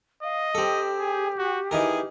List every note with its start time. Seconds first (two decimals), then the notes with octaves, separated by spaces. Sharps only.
0.23 D#5 F5
0.55 C4 G4 A4
0.99 G#4
1.39 F#4
1.71 E3 D#4 G#4 A#4